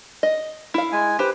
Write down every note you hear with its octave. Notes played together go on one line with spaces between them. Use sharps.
D#5
E4 F5
G#3 G#5
G4 B4 C5